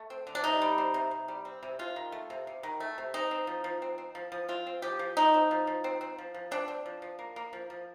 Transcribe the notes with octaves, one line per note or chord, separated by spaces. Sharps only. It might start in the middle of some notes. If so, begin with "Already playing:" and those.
Already playing: A3
C4
D3
D4
C3 D#4
G3
C4
C3
C3
G3
C4
C3
C3 F4
D#3
A3
C3
C3
D#3
A3
C3
C4 D#4
C4
F3
F3
C4
C4
F3
F3
C4 F4
C4
F3 G4
F3
C4 D#4
C4
F3
F3
C4
C4
F3
F3
C4 D4
C4
F3
F3
A#3
A#3
F3
F3